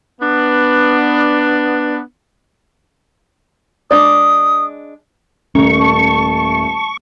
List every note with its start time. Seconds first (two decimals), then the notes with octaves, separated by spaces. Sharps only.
0.21 B3 D4
3.91 G#3 D4 D5 D#6
5.55 D#1 A3 C#4 A#5 C#6
5.80 A5